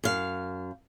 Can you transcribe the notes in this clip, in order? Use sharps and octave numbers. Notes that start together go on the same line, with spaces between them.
F#2 F5